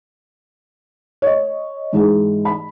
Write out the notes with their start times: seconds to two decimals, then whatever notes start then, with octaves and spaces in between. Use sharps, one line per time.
1.22 C#5 D#5
1.93 G#2 E3 D#4 G#4
2.45 B5